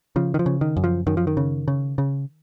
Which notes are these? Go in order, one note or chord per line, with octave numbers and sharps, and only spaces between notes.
C#3 F3
D#3
F3
C#3
D#3
F#2
F3
F#2 D#3
F3
D#3
C#3
C#3
C#3